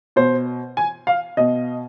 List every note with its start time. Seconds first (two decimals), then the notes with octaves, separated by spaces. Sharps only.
0.16 B2 C5
0.77 G#5
1.07 F5
1.37 B2 D#5